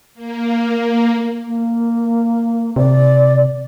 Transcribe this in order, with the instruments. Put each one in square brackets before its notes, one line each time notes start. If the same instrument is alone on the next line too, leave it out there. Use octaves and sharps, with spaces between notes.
[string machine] A#3
[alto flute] A#3
[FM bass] C3 [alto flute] D5